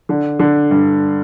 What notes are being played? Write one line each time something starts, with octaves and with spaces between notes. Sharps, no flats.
D3
D3
G2